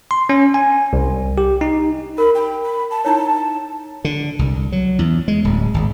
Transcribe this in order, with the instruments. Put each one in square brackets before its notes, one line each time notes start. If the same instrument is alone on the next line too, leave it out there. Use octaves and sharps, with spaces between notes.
[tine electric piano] C6
C#4
G#5
C2
G4
D#4
[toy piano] A#4 [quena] B5
[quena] G5
B5
A5
[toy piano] D#4 E4 C#5 [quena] A5
[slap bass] D3
C2
F#3
E2
G#3
D1
G#1